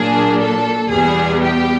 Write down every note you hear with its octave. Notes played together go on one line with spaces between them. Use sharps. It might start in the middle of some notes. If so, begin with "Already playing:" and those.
Already playing: A#2 F#3 A#3 D4 G#4
A4
E2 B2 G3 B3 G#4
G4